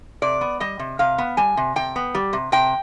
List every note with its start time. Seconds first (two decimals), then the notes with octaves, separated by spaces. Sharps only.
0.22 C3 D5
0.41 B3
0.60 G3 D#5
0.79 C3
0.99 C3 F5
1.18 B3
1.37 G3 G#5
1.57 C3
1.76 C3 G5
1.96 B3
2.15 G3
2.33 C3
2.52 C3 G5